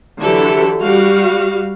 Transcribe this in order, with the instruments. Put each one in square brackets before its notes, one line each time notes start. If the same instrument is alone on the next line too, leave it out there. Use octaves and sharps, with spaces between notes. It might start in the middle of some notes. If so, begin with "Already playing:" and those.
[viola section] D3 E3 F#3 E4 G4 A4
G3 F#4 F5